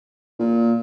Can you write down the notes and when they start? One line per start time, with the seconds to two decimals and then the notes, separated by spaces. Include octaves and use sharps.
0.40 A#2